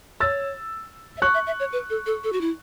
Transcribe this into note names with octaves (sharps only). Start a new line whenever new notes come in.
C#5 E6 A6
E5
C#5 C#6 F#6
E5
E5
C#5
B4
A4
A4
A4
F#4
E4